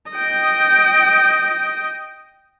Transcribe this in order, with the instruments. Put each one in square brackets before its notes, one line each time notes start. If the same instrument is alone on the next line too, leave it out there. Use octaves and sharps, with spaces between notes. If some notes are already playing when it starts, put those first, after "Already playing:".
[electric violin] D#5 G5